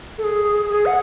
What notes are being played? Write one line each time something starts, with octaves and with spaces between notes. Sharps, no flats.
A4
G#4
G#4
F#5